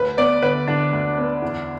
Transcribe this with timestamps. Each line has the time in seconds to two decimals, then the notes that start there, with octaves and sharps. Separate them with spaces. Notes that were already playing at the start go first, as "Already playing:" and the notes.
Already playing: D2 B4
0.17 B3 D5
0.42 D3 B4
0.68 D3 D4
0.93 D2
1.18 B3
1.42 E2